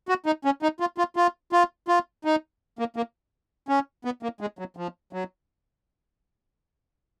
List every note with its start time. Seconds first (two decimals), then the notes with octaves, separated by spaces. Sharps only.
0.09 F#4
0.26 D#4
0.45 C#4
0.62 D#4
0.80 F4
0.98 F4
1.16 F4
1.53 F4
1.88 F4
2.25 D#4
2.79 A#3
2.96 A#3
3.69 C#4
4.05 B3
4.23 A#3
4.41 G#3
4.59 F#3
4.77 F3
5.13 F#3